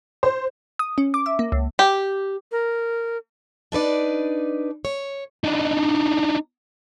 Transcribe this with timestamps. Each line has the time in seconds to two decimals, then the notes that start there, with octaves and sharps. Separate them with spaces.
0.23 C5
0.79 D#6
0.98 C#4
1.14 D6
1.26 E5
1.39 A#3
1.52 C#2
1.79 G4
2.52 A#4
3.72 D4 D#4 B4 D5
4.85 C#5
5.44 D4 D#4